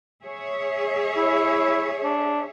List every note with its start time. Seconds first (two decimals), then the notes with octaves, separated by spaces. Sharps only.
0.24 G#4 C#5 E5
1.17 E4
2.04 D4